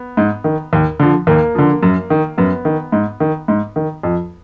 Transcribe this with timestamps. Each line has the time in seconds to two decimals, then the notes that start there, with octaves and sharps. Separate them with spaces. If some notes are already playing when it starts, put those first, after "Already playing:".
Already playing: B3
0.17 G#2
0.44 D#3
0.73 D#2
1.00 D3 F3
1.27 D#2 A#3
1.55 D3 F3
1.83 F#2
2.10 D#3
2.38 F#2 B3
2.65 D#3
2.92 G#2
3.20 D#3
3.48 G#2
3.76 D#3
4.03 F2